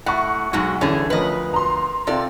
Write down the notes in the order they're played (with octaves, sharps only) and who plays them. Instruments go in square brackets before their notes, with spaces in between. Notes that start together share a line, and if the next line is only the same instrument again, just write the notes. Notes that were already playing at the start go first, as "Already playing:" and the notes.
[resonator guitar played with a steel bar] A2 [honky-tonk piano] F#5 C#6
[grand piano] B1 [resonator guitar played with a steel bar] G#2 G#3 F#4
[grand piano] C2 E3 [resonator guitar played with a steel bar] D3 G#4 [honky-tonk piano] C#4
[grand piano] D2 F3 A#4 [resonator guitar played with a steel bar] B4 D#5
[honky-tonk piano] A#5 C6
[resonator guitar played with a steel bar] C3 D5 [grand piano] C4 F4 A4